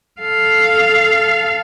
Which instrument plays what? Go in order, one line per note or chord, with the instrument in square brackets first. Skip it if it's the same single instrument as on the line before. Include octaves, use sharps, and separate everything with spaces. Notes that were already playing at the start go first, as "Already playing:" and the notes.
[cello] A4 F5